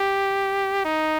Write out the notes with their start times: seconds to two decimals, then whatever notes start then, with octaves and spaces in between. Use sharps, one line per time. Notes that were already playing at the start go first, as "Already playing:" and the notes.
Already playing: G4
0.85 D#4